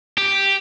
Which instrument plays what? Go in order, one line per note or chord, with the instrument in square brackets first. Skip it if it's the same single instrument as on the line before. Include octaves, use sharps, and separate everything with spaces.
[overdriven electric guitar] G4